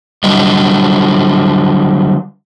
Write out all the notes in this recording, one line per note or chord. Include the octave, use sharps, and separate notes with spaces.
D3 F#3 G3 D#5